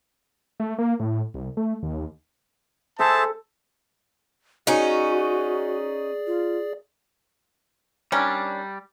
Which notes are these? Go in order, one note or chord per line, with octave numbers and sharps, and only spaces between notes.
A3
A#3
A2
C2
A3
D#2
G#4 A4 C5 E5 A5
C#4 D#4 F#4 G#4 D5
F4
D#3 G3 C#4 D4